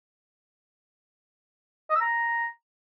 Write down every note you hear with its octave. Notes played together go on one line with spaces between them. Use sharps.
D#5
E6
A#5